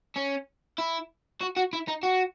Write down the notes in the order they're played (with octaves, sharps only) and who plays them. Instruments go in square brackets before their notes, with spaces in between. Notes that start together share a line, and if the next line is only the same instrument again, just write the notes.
[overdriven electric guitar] C#4
E4
F#4
F#4
E4
D#4
F#4